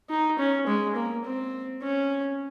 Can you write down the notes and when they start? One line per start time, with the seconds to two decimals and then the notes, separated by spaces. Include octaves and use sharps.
0.10 D#4
0.38 C#4
0.67 G#3
0.96 A#3
1.25 C4
1.82 C#4